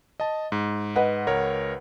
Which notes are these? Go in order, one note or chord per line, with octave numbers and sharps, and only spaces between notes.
D#5 A5
G#2
B4 D#5 F#5
C#2 A#4 C#5